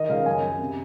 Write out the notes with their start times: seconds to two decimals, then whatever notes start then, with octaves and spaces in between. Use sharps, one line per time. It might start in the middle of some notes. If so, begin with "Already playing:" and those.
Already playing: D#3 D#5
0.09 C#2 F5
0.26 F#2 G#5
0.42 F#2
0.59 C3